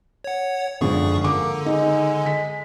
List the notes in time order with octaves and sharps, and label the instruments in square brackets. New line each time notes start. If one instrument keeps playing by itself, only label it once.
[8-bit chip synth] C#5 F#5
[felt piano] G#1 D3 F3 [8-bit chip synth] F#2 G#4 C#6
[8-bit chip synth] D3 [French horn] A#3 [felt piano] D6
[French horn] G#3 [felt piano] D#4
[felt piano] B6